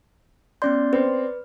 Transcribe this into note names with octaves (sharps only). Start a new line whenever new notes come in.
B3 C#4 D5 C6 G6
C4 B4